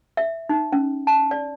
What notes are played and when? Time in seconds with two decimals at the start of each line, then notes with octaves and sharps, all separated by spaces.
0.17 E5
0.49 D#4
0.72 C#4
1.07 A5
1.31 D5